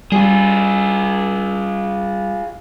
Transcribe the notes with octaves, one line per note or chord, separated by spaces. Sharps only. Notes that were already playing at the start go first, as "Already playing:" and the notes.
G3 F4 G#4